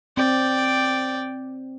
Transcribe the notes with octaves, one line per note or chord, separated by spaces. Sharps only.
C4 D5 G5